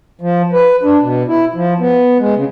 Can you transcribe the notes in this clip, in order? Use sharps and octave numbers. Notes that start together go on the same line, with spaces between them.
F3
B4
D4
B2
E4
F3
B3
G#3
C#3